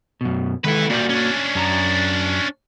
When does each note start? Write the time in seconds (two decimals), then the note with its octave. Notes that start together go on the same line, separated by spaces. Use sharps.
0.21 F#2 B2
0.64 D#3 G#3 E4 A4 B4
0.90 A#2 G3 A#3 F#4 D5
1.09 C#4 D4
1.55 F#2 A5 A#5